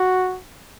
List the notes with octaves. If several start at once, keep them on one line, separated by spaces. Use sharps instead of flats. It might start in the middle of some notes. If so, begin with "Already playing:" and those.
Already playing: F#4